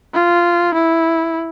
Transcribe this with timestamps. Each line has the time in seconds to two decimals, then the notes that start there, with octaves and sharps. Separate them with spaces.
0.14 F4
0.74 E4